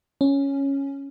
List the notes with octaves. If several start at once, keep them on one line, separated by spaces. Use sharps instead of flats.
C#4